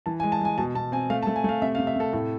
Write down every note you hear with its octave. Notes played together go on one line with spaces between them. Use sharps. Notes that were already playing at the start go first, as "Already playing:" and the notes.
E3 A5
G#5
G#3
A5
G#3 G#5
B2 A5
B2 A5
C4 G#5
A3 F5
A5
A3
G#5
A3 F5
C3 E5
F5
C3
E5
C3 A4
A2 A4